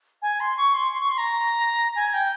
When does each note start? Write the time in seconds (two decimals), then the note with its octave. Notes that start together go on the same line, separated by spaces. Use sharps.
0.21 G#5
0.39 C6
0.57 C#6
0.74 C6
0.92 C6
1.00 C#6
1.09 C6
1.17 A#5
1.95 G#5
2.13 G5